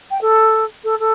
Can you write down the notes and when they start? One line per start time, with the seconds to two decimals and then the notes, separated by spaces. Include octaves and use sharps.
0.10 G5
0.21 A4
0.84 A4
0.99 A4